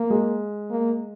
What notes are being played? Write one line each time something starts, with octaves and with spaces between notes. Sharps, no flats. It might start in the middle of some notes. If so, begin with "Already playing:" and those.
Already playing: A#3
G#3
A#3